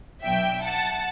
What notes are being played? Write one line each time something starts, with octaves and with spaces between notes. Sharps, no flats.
B2 F#3 B3 D4 E5 G5
F#5 A5